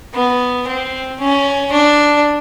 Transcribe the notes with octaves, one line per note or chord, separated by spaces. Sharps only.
B3
C4
C#4
D4